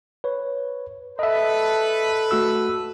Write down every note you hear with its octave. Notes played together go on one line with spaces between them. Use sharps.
B4 C#5
A4 B4 D#5 E5
A3 F#4 E6